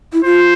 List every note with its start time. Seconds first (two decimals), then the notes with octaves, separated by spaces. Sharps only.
0.13 E4
0.24 F4 C5